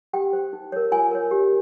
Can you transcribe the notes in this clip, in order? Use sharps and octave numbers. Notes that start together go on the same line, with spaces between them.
G4 G5
C5
D#4
A#4 C#5
F4 G#5
A#4 C#5
G4